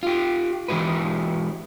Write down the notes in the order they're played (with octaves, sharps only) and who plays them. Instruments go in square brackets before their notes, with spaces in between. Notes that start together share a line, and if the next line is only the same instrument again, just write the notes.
[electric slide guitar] F4 G4
E3 G#3 E4 G4 B4